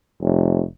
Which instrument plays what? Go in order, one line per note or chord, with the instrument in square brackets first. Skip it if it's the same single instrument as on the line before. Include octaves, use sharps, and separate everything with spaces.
[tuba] F1